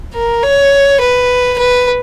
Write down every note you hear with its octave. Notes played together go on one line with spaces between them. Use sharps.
A#4
C#5
B4
B4